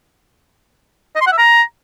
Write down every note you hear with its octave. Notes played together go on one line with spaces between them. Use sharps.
D#5
C6
F#5
E5
A#5